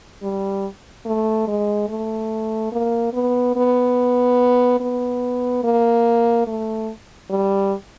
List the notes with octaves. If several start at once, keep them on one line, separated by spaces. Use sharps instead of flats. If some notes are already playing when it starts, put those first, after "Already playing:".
G3
A3
G#3
A3
A#3
B3
B3
B3
A#3
A3
G3